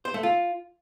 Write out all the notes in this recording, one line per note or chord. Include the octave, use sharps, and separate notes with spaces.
C5
A3
F4